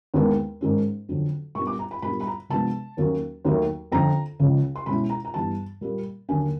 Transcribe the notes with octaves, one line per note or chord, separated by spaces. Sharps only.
D#2 D#3 G#3 B3 D4
G#2 D#3 G#3 C#4
F2 D3 F#3
A#2 G3 B3 D4 C#6
D6
A#5
B5
A#2 G3 B3 D4 B5
B5
A#5
C3 F3 G#3 B3 D4 A5
D#2 D#3 F#3 A#3 C#4
D#2 D#3 F#3 A3
F2 D3 F3 A#5
C#2 C#3 F3
C6
B2 G#3 C#4 E4 B5
A#5
A#5
G2 E3 G3 B3 A5
A#2 G3 A#3
D#2 D3 F#3 A#3 D4 G#5